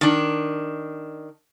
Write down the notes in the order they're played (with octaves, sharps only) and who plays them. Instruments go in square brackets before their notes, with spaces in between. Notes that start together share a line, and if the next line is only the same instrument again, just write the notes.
[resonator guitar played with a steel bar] D#3 D4